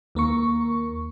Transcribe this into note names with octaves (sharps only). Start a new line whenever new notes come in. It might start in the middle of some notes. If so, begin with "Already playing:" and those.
D#2 A#3 A#4 C#6